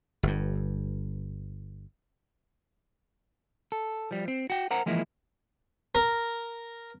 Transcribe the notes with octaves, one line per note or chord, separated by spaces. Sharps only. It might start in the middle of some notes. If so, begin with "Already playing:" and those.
G1 G2
A4
F3 G3
C4
F#4 G5
A#4 C5 F#5 A#5
E3 F3 G#3 A#3 E4
A#4